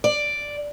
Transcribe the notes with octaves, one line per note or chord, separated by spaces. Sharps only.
D5